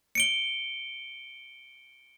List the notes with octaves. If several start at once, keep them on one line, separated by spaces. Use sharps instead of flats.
C#7 D7 G7